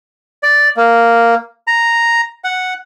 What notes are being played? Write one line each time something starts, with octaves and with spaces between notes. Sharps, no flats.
D5
A#3
A#5
F#5